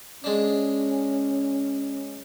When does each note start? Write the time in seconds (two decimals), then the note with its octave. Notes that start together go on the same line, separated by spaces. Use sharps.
0.24 G#3 C#4 D4